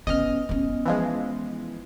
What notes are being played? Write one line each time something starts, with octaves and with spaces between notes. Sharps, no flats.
B3 C#4 D#5 F6
B3 C#4
E3 F3 G#3